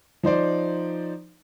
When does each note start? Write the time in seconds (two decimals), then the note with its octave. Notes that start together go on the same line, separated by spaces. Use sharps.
0.23 F3 D#4 C5 D5